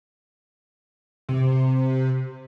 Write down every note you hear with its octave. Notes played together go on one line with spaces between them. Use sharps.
C3